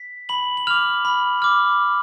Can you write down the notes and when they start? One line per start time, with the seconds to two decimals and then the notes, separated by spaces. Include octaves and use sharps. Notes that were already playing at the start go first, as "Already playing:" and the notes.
Already playing: B6
0.29 B5 F#7
0.57 F#7
0.67 D6 F6 F7
1.05 B5
1.42 D6 F6